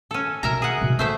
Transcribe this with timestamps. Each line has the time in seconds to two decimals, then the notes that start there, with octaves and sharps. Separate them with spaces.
0.11 C#4 A4
0.43 B2 A#4 E5 A#5
0.62 G#4 F#5
0.82 B2
0.99 A3 D4 C5 E5